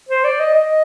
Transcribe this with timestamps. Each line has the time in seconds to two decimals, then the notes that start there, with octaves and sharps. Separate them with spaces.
0.09 C5
0.24 D5
0.39 D#5
0.54 D#5